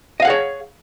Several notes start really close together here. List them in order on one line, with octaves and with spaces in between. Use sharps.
D#5 F5 F#5 G#4 C#5